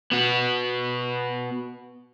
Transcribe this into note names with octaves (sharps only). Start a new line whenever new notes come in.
B3 F#4